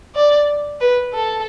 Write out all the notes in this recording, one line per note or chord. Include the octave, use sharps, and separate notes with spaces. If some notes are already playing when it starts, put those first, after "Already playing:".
D5
B4
A4